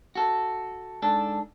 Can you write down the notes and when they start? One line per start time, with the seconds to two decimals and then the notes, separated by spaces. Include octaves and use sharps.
0.15 F#4 A4
1.02 G#2 D4 A4